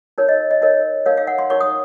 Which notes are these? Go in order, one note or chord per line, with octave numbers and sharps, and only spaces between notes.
D#4 A#4 C#5
D#5
D#5
D#4 A#4 C#5 D#5
D#4 A#4 C#5 F5
F5
F#5
C6
D#4 A#4 C#5 C#6
D#6